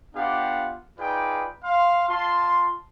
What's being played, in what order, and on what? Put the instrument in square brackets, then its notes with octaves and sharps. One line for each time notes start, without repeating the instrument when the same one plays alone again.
[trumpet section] B3 D4 F4 G4 F5 F#5
D#4 F4 G#4 B4 D5 G5
F5 C6
F4 A5 C6